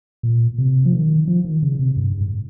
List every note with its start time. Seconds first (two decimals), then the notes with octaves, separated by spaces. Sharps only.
0.23 A#2
0.58 C3
0.85 F3
0.93 D#3
1.28 F3
1.45 D#3
1.63 C#3
1.79 C3
1.97 G2
2.21 G#2